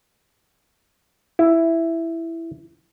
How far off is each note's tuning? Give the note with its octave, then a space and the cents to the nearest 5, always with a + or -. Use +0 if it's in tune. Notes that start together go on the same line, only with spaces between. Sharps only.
E4 +5